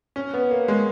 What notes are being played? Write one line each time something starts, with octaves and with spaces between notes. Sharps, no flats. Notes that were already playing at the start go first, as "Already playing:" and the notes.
C#4
B3
A#3
G#3